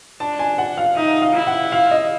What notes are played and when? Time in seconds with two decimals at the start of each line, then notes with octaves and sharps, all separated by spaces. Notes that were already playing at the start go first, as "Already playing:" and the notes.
0.20 D4 A5
0.39 G#5
0.58 F#5
0.77 F5
0.96 D#4 E5
1.22 F5
1.34 E4
1.47 F#5
1.72 F5
1.91 D#5